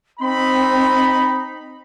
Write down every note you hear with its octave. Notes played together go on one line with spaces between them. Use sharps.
C4 D#4 B5